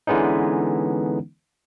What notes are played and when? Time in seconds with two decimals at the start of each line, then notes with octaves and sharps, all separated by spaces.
0.07 D3 E3 G#3 B3 C#4 D#4